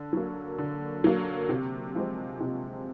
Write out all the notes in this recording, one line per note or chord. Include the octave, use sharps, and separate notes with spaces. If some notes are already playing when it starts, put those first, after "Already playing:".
Already playing: D3
F#3 A#3
D3
F#3 A#3
C3
F3 G#3 C4
C3